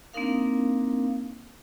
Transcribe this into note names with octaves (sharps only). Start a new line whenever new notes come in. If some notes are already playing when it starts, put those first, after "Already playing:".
A#3 C4 D4 D#4 A#4 F5